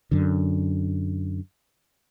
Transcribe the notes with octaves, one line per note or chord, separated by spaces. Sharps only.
F#2 D3